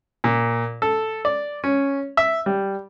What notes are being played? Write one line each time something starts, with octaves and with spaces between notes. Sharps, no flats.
A#2
A4
D5
C#4
E5
G3